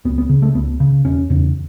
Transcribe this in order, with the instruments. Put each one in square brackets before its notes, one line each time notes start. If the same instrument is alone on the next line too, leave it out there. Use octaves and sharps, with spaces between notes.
[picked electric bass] C#2 B3
B3
C#3
A3
C#2 B3
C#3
E1 C#4
E2 C#3